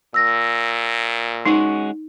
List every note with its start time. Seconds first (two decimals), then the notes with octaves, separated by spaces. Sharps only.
0.14 A#2 E6 A#6
1.45 G#3 C#4 D#4 F#4